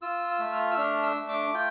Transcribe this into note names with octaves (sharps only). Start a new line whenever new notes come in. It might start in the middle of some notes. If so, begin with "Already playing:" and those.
F4 E6
E6
A3
F6
E6
D4 F6
E6
A3
D6
F4 G5